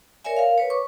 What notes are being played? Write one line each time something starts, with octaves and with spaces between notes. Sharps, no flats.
A#4 C#5 D5 E5 G#5
A#4 F5
B4 C#5
C#6 D6